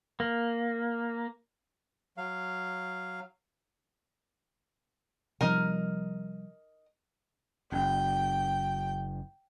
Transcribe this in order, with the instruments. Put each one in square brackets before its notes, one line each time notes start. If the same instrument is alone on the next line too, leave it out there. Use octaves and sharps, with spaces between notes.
[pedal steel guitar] A#3
[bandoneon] F#3 F5
[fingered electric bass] C3 F3 G3 [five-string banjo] D#4 A#4
[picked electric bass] F#1 [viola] G5